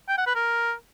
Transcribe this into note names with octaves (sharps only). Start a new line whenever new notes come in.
G5
F#5
B4
A#4